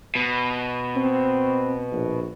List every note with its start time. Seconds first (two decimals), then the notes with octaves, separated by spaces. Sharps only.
0.15 B2
0.96 C4
1.92 A#1